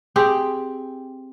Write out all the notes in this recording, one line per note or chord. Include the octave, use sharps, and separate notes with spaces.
C4 G4 G#4